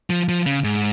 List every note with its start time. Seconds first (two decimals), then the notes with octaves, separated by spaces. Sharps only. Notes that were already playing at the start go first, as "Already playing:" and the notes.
0.10 F3
0.29 F3
0.46 C#3
0.64 G#2